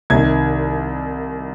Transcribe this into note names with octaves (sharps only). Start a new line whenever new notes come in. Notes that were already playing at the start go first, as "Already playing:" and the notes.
C2 C3 D#3 G#6